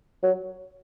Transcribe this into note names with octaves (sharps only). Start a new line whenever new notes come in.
F#3